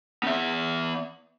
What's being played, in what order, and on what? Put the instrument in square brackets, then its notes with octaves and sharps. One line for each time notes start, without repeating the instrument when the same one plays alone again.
[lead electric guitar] B3 E5